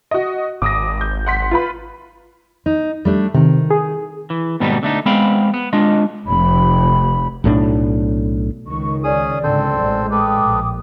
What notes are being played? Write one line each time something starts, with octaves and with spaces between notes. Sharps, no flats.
F#4 D#5
G#1 D6 D#6 A#6
G6
F#5 C6 B6
F4 B4 B5
D#4
G3 A3 D4
C3 D#3
G#4
E3
D#2 G#2 B2 G3 B3 D#4
D3 A3 D#4
G#3 B3 C4 F5 G5 B5
B3
G#3 D4 F4 D#5
F1 B5
B1 A2 E3 D4
C#2 D#3 C#6
C#4 G#4 D5 D#6
C#2 G#2 D3 C4 A4 C5
A1 A2 G#3
A4 B4 G5 D6 D#6
A#1